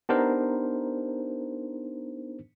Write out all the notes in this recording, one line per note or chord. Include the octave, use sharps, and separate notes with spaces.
B3 D4 D#4 G4 A#4 C5